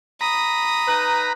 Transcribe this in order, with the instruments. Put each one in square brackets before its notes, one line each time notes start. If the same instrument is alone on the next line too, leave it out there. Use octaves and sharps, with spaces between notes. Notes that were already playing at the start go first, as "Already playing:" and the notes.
[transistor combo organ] A#5 B5 [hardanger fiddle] D#6
[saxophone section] D#4 B4